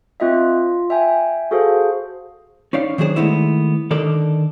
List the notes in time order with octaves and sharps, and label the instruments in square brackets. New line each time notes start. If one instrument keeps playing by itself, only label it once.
[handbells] C4 F4 D#5 E5
F4
E5 G5 G#5
F#4 G#4 A4 C5 F5
[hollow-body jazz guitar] C#4 D#4 D5 F5
D#3 F#3 D4 G#4 C5
D#3 E3 G#3 A3 B3 E4
D3 D#3 D#4 A4 A#4 D5